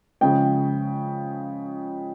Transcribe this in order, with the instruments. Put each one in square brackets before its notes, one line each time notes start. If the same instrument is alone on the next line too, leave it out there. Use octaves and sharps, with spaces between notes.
[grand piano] C#3 F3 G#3 G5